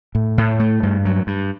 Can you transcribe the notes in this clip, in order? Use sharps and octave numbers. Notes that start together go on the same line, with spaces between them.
A2
A2
A3
G2
F#3
G2